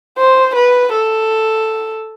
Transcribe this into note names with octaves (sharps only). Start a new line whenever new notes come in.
C5
B4
A4